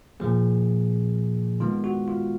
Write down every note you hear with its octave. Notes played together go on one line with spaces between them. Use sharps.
A#2 F3 A#3 G#4
D#3 G#3 B3 F4
F#4
F4